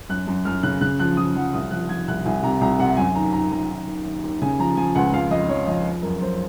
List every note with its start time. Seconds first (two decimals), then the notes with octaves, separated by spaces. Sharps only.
0.09 F#2 F#6
0.27 F#2
0.45 F#2 F6
0.63 C#3 F#6
0.81 C#3 F#6
0.99 F3 F#6
1.17 F3 D#6
1.35 F3 F#5
1.53 C2 D#6
1.71 F3 F#6
1.89 F3 G#6
2.08 C2 F#6
2.25 C2 G#5
2.43 C3 A#5
2.61 C2 A#5
2.79 C3 F#5
2.97 F#2 G#5
3.15 D#3 A#5
3.33 D#3 A#5
3.52 F#2 A#5
3.69 D#3
3.87 D#3
4.05 D#2
4.24 D#2
4.42 C#3 G#5
4.59 F3 A#5
4.77 F3 G#5
4.95 C#2 F#5
5.13 F2 F5
5.31 F2 D#5
5.49 F3 C#5
5.67 F2 D#5
5.84 F3
6.03 F#2 A#4
6.21 F#2 C5